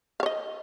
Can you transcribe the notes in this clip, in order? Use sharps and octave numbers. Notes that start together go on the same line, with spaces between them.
C#5 D#5 F5